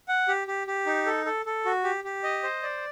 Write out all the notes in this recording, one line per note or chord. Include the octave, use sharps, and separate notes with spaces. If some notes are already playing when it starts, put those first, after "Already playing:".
F#5
G4
G4
G4
D#4
A4
A4
A4
F#4
G4
G4
D#5
C5
D5